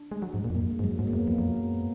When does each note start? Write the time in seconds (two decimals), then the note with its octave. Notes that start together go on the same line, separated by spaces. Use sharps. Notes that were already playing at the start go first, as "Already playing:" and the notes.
Already playing: D4
0.12 G#3
0.22 F#3
0.34 G#2
0.44 A#2
0.50 F2
0.55 F#2 A#3
0.70 G#3
0.79 G#2
0.84 F#2 F#3
0.99 G#2 G#3
1.07 A#3
1.13 F#2 B3
1.27 F2 A#3
1.38 F2
1.42 F#2